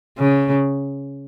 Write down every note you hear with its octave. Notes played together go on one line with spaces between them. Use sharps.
C#3